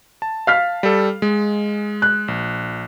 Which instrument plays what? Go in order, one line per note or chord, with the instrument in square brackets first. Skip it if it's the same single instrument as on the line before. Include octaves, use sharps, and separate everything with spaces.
[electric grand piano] A5
[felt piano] F5 F6 B6
[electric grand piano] G3 A4
G#3
[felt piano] F#6
[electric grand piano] A#1